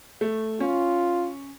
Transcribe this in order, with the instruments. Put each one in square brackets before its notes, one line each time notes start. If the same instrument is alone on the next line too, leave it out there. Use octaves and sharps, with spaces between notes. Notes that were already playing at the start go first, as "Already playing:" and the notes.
[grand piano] A3
[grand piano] C#4 [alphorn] F4